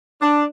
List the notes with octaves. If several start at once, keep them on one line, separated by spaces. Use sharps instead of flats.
D4